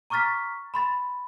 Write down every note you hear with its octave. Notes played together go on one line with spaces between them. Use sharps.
A#5 C#6 D6 F6 A6 B6
B5 C6 A6